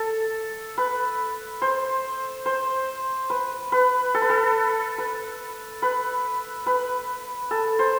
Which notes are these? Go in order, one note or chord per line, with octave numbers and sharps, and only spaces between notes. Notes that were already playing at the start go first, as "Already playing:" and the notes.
Already playing: A4
B4
C5
C5
B4
B4
A4
B4
A4
B4
B4
B4
A4
C5